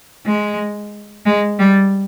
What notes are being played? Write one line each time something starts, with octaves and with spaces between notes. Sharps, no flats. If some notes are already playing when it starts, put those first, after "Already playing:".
G#3
G#3
G3